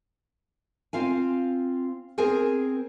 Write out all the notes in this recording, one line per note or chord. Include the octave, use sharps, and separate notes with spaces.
C4 F4 F5 G#5
C4 G#4 A#4 G#5